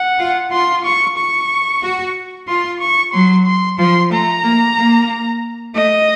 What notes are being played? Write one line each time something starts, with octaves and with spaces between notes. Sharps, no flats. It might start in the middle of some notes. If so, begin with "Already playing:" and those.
Already playing: F#5
F4
F4 C6
C#6
C#6
F#4
F4 C6
C#6
F#3 C6
C6
F3 C6
A3 A#5
A#3
A#3
A3 D#5